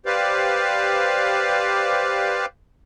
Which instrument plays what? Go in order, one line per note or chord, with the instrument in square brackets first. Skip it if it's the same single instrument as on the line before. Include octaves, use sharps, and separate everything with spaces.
[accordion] G4 B4 C5 D5 F5